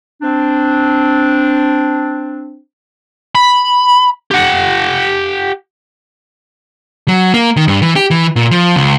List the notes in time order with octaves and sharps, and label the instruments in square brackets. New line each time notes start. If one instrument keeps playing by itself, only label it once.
[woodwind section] C4 D4
[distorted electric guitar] B5
G4 F#5
[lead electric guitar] F#3
A#3
D#3
G2
E3
G4
E3
A#2
F3
C#2